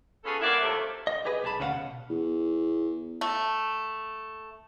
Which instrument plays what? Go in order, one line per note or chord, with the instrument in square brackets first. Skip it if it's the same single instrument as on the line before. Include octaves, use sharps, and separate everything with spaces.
[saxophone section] B3 C#4 F4 G#4 A4
G2 A#3 C#5 D5 E5 F#5
D#2 C3 F3 A3 A4
[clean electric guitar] D#5
G4 G#4 B4 D#5
B1 B3 G#4 A5 B5
D2 C#4 F#4 B4 F5 F#5
B2
[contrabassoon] E2
[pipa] A3